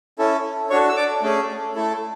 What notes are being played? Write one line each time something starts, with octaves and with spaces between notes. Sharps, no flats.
C#4 E4 A4
D4 F#4 A4 C#5 C#6
E6
D5 D6
A3 C#4 G#4
A3 E4 A4